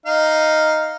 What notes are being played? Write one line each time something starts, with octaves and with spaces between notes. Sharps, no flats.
D#4 F5